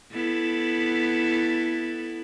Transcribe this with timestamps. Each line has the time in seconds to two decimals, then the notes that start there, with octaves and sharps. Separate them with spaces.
0.13 B3 E4 A4